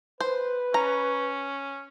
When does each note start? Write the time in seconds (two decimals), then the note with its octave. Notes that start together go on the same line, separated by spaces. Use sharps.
0.20 B4 C5
0.74 C#4 A#5